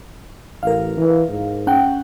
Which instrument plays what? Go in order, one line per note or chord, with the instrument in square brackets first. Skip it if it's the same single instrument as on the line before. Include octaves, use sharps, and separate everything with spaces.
[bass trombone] A1 [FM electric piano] A#4 F5
[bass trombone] E3
G#2
[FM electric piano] C#4 F#5 G5